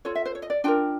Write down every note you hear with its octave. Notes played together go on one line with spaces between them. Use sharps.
F4 A4 C#5
E5
C5
C#5
D#5
D5
D4 F4 A#4 G5